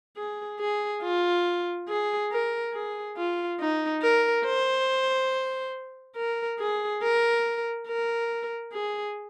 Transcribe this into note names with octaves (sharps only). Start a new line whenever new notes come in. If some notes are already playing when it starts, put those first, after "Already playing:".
G#4
G#4
F4
G#4
A#4
G#4
F4
D#4
A#4
C5
A#4
G#4
A#4
A#4
G#4